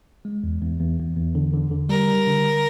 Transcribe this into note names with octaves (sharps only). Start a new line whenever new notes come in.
G#3
E2
E2
E2
E2
E2
D3
D3
D3
G3 A#4
G3
D3